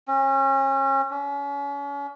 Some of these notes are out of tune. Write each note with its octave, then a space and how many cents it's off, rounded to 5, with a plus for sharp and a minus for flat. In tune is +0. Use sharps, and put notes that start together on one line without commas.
C#4 -30
C#4 +35